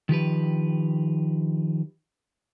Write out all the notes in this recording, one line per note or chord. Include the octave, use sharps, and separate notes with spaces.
D#3 F3 G4 B4